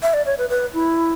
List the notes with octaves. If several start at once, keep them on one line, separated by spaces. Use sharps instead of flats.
E5
D5
C#5
B4
B4
E4